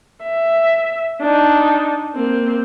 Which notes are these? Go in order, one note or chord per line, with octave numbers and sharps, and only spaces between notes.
E5
D4 D#4
A#3 C4